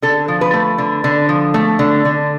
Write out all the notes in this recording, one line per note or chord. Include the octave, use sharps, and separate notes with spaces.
D3 A4
F3
B4
A3
D3
D3
F3
A3
D3
D3